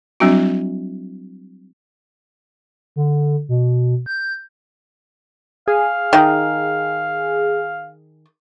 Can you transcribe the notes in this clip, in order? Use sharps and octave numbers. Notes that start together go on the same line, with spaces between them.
F#3 G3 C4 D4 E4 F#4
D3
B2
G6
G#4 F5
D#3